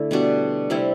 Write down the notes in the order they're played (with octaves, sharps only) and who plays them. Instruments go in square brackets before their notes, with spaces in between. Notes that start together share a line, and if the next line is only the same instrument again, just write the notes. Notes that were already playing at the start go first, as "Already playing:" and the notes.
Already playing: [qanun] D3 A3 E4
B2 G3 D4 F#4
C3 G3 C4 E4